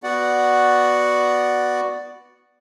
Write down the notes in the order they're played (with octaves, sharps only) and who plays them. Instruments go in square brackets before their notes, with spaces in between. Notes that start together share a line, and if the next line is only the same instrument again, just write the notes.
[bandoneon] B3 F#4 D5 F#5